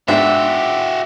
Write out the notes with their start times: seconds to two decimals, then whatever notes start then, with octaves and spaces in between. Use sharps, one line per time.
0.08 G#2 B3 D4 F#4 G4 E5